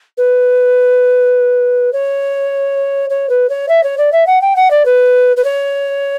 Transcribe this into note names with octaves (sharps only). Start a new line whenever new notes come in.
B4
C#5
C#5
B4
C#5
E5
C#5
D5
E5
F#5
G5
F#5
D5
B4
B4
C#5